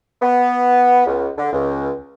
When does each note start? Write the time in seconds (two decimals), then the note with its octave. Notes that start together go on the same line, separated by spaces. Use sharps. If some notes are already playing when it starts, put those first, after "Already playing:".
0.22 B3
1.06 C#2
1.37 D3
1.52 C#2